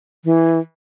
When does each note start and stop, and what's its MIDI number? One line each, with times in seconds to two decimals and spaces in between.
0.25 0.58 52